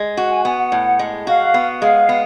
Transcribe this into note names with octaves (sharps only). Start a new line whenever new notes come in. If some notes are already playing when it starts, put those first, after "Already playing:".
Already playing: G#3
F#4 F#5
G#5
B3 G#5
F#5
A2
G#3
F#4 F5
B3
G#3 F5
B3